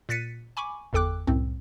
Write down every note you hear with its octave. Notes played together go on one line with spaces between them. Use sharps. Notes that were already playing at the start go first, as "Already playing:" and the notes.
A#2 F#6 A6 B6 C#7 D#7
G#5 B5 C#6 D6
G1 E2 A4 G5 D6 F#6
C2 F#2 A2 C4